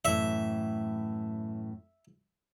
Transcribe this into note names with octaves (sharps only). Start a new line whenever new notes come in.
F#2 A2 E3 E5